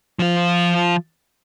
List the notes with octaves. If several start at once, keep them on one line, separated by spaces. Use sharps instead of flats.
F3 F4